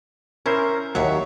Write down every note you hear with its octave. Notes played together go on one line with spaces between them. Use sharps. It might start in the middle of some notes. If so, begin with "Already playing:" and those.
C#4 E4 A#4 C5
D#2 F#3 C#5 E5